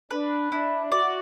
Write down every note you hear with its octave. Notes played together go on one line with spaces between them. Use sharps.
D4 B4
D4 E4
F#4 D5